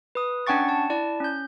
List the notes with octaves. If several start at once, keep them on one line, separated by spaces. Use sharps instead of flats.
B4 D#6
C#4 D4 F#5 G5 C#6 A6
A5
E4 D5 A5
C#4 G6